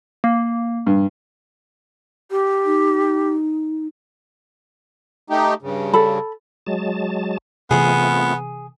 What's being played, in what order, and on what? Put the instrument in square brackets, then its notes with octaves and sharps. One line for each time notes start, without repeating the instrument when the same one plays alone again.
[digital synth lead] A#3
[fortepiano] G2
[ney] G4
[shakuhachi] D#4
[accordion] A3 D#4 G4
G2 C#3
[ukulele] A4 B5
[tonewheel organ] F#3 G#3 A5
[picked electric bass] C3 E3 [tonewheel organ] A3 C4 F4 [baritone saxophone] B3 [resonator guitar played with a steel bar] G#4